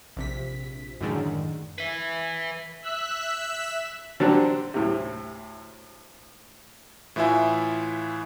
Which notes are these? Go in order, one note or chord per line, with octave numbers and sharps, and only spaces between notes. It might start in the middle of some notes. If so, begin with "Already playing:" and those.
A#1 C3 B6
F#2 A2 D3 D#3 G#3
B4 E5
E5 E6 F#6 B6
D3 F#3 G3 C4 D4
D2 A2 C3
A2 E3 E4 F4 E5 G#5